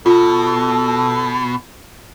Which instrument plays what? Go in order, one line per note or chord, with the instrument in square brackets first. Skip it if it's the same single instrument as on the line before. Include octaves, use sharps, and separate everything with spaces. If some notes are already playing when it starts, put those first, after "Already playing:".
[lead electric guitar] B2 [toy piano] F4 [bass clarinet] A4